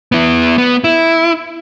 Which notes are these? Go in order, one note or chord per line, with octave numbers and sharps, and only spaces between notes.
B3 E4
B3
E4